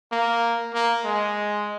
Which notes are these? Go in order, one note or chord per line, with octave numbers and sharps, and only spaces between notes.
A#3
A#3
G#3